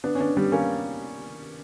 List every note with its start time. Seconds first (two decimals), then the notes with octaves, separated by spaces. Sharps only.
0.04 B3 D4
0.15 C#4
0.20 B3 D4
0.37 G3 B3
0.52 A#3 C#4